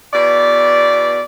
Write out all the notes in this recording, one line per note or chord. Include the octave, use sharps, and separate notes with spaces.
E2 B2 D5